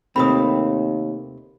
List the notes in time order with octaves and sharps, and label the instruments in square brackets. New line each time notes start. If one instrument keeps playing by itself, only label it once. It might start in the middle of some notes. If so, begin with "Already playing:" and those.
[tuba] D#2 [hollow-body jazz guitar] C3 A3 C4 [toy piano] B5 D#6